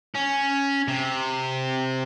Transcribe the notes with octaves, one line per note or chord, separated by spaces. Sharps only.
C#4
C3